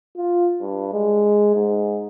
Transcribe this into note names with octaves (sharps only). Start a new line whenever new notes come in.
F4
G2
G#3
G#2